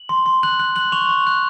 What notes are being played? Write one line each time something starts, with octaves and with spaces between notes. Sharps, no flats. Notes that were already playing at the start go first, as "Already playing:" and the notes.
Already playing: F#7
C6
C6
F#6 F#7
F#6
F#6 F#7
C#6 F7
C#6
F#6